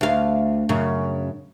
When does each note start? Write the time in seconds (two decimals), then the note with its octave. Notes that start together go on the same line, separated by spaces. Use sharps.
0.01 D2 F5
0.69 F#2 C#3